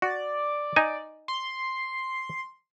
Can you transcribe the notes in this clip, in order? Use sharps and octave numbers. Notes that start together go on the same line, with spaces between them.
F#4 D5
D#4 G#5
C6